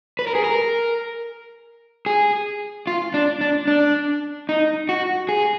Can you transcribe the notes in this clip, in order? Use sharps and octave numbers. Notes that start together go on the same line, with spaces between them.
B4
A#4
G#4
A#4
G#4
F4
D4
D4
D4
D#4
F#4
G#4